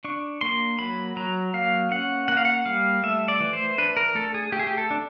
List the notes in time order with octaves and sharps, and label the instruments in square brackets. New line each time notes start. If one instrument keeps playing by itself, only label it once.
[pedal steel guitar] D4 C#6
A#3 C6
F#3 B5
F#3 A#5
A#3 F5
C#4 F#5
A#3 F#5
F5
F#5
G3 F5
A3 E5
D5
E3
C5
D4 B4
A#4
A3 A4
G#4
A3 G4
G#4
G4
A4
D4